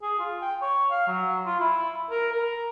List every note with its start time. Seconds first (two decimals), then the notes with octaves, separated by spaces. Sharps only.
0.02 G#4
0.19 F4
0.41 G5
0.62 C#5
0.91 F5
1.07 F#3
1.46 F4
1.60 E4
2.10 A#4
2.33 A#4